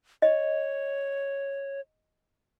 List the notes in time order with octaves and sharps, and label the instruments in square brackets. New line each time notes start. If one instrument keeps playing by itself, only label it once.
[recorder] C#5 [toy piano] D#5